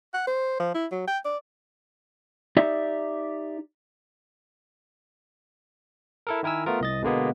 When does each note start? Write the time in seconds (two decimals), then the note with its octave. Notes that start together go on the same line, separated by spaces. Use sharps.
0.14 F#5
0.27 C5
0.60 F3
0.75 E4
0.92 F#3
1.07 G5
1.25 D5
2.57 D#4 G4 D5 E5
6.27 E4 A4 A#4
6.43 D#3 E4 A#4 G#5 E6
6.66 A3 B3 F4 A#4
6.81 C2 D#5 A6
7.02 B2 D3 G#3 A#3 B3